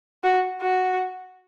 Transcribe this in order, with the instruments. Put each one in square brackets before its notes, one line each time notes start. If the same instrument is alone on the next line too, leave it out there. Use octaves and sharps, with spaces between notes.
[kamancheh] F#4
F#4